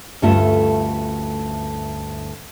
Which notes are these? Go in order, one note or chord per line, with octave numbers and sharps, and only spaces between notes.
D2 G2 A3 C#4 F4 A5